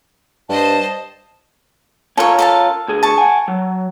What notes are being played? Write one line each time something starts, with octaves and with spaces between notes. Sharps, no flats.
G2 C5 D#5 A5
C#4 F4 A4 A#4 C#5
A4 F5 A5
D2 G#4
A5 C#6
F#5 G#5
F#3